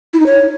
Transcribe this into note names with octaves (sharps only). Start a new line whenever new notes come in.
E4
D#4
C#5